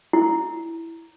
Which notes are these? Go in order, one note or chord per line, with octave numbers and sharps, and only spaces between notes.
E4